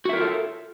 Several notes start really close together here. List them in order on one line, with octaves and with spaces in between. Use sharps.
F#4 E5 A#4 F4 A4